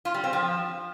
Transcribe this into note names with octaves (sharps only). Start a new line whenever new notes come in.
F4
G3
C4
F3